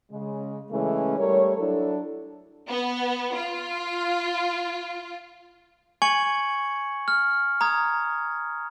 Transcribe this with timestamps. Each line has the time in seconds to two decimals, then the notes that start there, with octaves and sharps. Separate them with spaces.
0.12 C#3 G#3
0.72 C#3 E3 G#3 A3 C#4
1.18 G3 A3 A#4 C#5
1.57 F#3 D4 E4 A4
2.70 B3
3.35 F4
6.02 G#5 C#6 G#6 C#7 F#7
7.08 F6
7.61 A#5 D#6 G#6